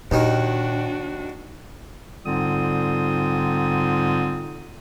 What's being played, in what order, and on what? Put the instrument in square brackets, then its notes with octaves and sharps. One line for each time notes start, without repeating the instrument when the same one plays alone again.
[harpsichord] D#2 D#3 [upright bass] A#2 [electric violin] D4 F#4
[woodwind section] G#2 D3 G3 C4 F4 D#6